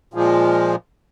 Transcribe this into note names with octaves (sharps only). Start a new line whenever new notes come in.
A#2 F3 G#3